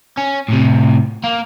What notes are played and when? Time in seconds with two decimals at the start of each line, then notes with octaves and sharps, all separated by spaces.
0.17 C#4
0.48 A2 C3
1.24 A#3